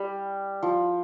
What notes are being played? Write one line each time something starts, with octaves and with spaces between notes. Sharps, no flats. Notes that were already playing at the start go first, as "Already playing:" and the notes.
Already playing: G3
F3